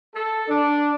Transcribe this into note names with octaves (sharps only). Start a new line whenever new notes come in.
A4
D4